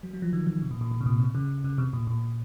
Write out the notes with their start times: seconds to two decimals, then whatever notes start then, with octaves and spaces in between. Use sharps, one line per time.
0.03 F#3
0.13 F#3
0.22 F3
0.33 D#3
0.47 D#3
0.62 C3
0.71 A#2
0.81 A#2
0.91 A#2
1.01 C3
1.06 A#2
1.20 C3
1.35 C#3
1.64 C#3
1.78 C3
1.93 A#2
2.07 A#2